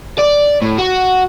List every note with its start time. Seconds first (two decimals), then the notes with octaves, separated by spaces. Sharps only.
0.18 D5
0.62 A2
0.78 F#4